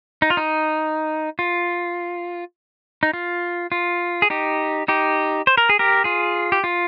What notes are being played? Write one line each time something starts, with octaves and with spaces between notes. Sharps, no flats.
D#4
F4
D#4
F4
D#4
F4
F4
G#4
D#4 G4
D#4 G4
C5
A#4
G#4
G4 A#4
F4 G#4
G4
F4